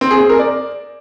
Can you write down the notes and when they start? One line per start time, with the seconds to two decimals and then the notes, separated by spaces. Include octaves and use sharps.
0.01 C4
0.11 G#4
0.20 C4
0.30 A#4
0.39 D5